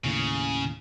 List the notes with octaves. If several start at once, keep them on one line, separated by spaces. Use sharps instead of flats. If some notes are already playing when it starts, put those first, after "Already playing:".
D#2 A2 C#3